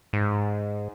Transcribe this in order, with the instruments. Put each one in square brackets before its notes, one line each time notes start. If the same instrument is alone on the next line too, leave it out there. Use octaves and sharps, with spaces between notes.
[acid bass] G#2